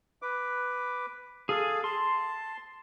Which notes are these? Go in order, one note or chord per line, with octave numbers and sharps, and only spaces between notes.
B4 D6
G#4 A4 F5
A5 C6